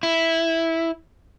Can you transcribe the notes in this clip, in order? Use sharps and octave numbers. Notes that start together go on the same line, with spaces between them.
E4